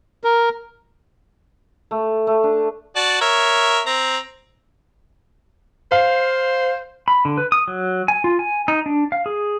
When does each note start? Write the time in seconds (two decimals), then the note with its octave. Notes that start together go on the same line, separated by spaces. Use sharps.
0.24 A#4
1.91 A3
2.27 A3
2.44 D4
2.96 F#4 D5 A5
3.21 A#4 C#5 E5
3.86 C4 A#5
5.92 C5 F5
7.08 B5
7.25 D3
7.38 B4
7.52 D#6
7.68 F#3
8.08 G#5
8.24 F4
8.39 G#5
8.68 D#4
8.86 D4
9.12 F5
9.26 G#4